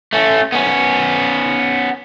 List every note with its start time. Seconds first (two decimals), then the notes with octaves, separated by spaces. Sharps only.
0.13 A3 C#4
0.52 B3 C#4